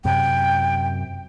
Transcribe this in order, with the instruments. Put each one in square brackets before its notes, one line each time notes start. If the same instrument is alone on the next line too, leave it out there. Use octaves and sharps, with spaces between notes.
[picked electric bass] F#2 C3 [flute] G5